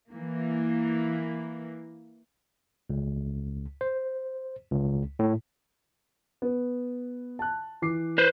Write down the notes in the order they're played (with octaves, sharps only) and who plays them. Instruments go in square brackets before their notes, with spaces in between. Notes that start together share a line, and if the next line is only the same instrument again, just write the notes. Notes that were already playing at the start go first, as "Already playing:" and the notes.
[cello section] E3 A#3
[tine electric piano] C#2
C5
C#2
A2
[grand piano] B3
A5 F#6
E3 D6 C7
[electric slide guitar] B4 C5